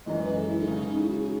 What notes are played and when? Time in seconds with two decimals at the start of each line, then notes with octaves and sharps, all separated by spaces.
0.06 F#2 E3 G#3 D#5
0.21 B4
0.36 A4
0.47 E4
0.58 D#4
0.67 C#3 G#3 C#4 G#4
0.98 E4
1.09 F#4
1.19 G#4